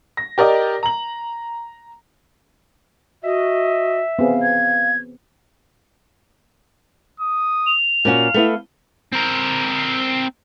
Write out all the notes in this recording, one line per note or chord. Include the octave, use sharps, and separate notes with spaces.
A#6
G4 A#4 D5 D#5
A#5 F#7
F#4 D#5 E5
B3 C4 G#4 F5
G#6
D#6
F7
A#2 C#4 F#4 F5
A3 B3 E4
C4 A#4